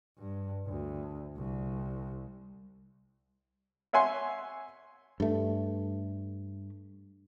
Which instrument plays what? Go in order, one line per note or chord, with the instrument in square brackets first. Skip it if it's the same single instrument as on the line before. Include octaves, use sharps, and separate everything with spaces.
[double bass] G2
D2
C2
[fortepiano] C#5 E5 F#5 G#5 C6
[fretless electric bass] G2 A3